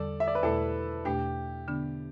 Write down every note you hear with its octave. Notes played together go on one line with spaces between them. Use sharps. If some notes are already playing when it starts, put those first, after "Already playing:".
Already playing: E2 D3 G3 A4 D5
E5
D5
B4
E2 B2 A3 E4 A4
E2 B2 A3 D4 G4
D3 B3 D4